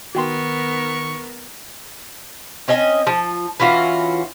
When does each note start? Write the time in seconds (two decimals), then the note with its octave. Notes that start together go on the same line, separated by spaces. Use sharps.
0.15 D#3 B3 F#4 A#4 G5 C6 C#6
2.68 C4 C#4 D#5 G#5
3.07 F3
3.60 E3 C#4 F4 F#4